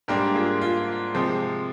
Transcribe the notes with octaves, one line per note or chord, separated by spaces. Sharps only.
G#2 G3 A#3 D4 G4 A#4
F4 G#4
F4
C3 F3 G#3 C4 G4